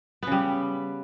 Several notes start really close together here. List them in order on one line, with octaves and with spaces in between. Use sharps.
B3 C#3 G3